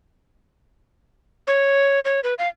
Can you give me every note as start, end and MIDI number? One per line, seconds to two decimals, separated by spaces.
1.47 2.00 73
2.05 2.20 73
2.24 2.34 71
2.39 2.48 77